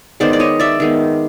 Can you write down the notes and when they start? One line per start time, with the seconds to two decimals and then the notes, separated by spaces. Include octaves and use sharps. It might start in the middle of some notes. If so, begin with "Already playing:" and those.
0.20 D#3 G#3 B3 C5 D5
0.33 D5
0.40 C#5 D#5
0.60 D5 E5
0.80 D#3 G#3 B3